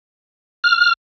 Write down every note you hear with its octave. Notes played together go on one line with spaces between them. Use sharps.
F6